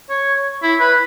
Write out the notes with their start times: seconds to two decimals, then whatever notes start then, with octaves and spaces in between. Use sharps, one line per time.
0.10 C#5
0.63 E4
0.80 B4